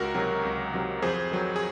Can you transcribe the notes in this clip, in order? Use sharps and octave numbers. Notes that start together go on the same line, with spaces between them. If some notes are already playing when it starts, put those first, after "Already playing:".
Already playing: C#2 F#4 A#4
C3 D#3 F#3
C#2
C3 D#3 F#3
F2 G#4 C5
D#3 F#3
G#4